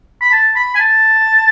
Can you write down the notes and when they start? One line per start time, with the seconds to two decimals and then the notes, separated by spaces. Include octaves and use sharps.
0.21 B5
0.32 A5
0.56 B5
0.75 G#5
0.79 A5